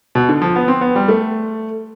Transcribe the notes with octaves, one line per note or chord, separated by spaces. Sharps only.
B2
D3
F3
B3
C4
B3
G3
A3